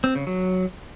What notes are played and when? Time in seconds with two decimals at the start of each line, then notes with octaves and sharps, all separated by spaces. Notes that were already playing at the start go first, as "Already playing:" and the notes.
0.04 C4
0.15 C#3
0.27 F#3